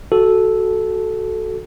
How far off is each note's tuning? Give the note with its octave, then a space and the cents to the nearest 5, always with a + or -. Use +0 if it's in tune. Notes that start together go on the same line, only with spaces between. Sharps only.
F#4 +15 A4 -5